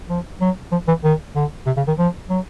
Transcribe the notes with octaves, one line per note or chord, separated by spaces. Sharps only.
F3
F#3
F3
E3
D#3
D3
C3
C#3
D#3
F3
F#3